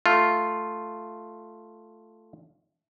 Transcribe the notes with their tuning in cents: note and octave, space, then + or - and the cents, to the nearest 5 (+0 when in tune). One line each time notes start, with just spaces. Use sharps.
A3 +0 F4 +0